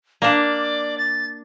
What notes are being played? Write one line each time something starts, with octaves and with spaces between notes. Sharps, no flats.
A#3 D4 D5
A6